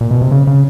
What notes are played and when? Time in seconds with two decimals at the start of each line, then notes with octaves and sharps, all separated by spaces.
0.01 A#2
0.11 B2
0.22 C3
0.31 C#3
0.47 C#3